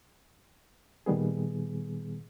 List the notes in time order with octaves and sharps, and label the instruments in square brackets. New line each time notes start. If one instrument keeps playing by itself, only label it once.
[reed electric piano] A#2 D#3 G3 B3 G#4